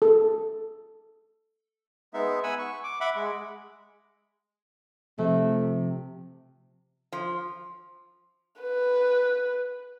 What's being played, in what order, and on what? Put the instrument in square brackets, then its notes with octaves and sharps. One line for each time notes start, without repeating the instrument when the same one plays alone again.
[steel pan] A4
[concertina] G#3 B3 D#4 E5
F#5 G#5 B5 E6
C#6
D6
E5 F#5 B5 D6
G#3
[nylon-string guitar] C3 [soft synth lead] F3 [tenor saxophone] A3
[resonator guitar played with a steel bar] F3
[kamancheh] B4